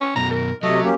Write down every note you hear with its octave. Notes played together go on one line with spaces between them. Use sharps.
C#4
F#2 B2 D#4 A#5
A#4
C3 F#3 A3 D#5
A#3 C#4 G4